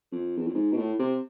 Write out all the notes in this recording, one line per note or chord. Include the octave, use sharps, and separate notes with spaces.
F2
E2
F2
G#2
B2
A2
C3